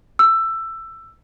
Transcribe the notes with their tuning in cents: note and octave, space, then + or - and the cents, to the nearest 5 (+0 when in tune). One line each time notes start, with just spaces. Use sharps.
E6 +15